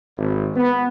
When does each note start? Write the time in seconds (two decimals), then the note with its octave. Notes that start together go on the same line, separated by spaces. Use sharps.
0.17 G#1
0.55 B3